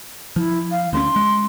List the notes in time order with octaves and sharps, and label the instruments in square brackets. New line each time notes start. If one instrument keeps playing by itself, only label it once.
[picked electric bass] F3 [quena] E4
[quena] F5
[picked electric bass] D2 G#3 C#4 [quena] C6
[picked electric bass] G#3